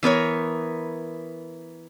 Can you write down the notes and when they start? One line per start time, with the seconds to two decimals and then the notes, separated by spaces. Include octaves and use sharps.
0.03 E3 B3 A#4 C#5